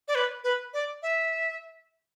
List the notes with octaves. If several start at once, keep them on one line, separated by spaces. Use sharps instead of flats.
D5
B4
B4
D5
E5